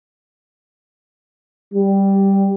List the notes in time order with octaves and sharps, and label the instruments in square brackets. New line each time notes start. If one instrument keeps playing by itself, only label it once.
[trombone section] G3